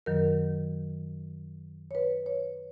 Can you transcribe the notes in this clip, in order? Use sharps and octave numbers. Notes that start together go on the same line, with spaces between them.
F#2 D#3 F#3 A#4
C#5
B4
C#5